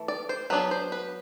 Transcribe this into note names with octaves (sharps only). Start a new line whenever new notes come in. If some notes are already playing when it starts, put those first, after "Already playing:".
Already playing: E3 A3
D5
C5
F#3 B3 D4 B4
C5
B4